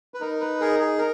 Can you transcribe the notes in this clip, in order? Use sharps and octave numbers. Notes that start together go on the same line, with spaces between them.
B4
D#4 A#4
B4
G#4 A#4
G#4
A#4